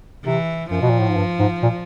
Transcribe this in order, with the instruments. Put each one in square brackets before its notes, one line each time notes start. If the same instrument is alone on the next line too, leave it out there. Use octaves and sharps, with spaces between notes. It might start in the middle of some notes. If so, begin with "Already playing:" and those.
[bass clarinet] C3 [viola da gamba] E3
[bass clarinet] F#2 [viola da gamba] F3
[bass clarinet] B2
A#2
A2
G#2
G2
G#2
A#2